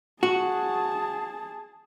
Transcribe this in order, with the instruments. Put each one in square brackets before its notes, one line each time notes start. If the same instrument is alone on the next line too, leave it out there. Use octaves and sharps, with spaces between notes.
[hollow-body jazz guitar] F#4 [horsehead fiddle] G#4 A5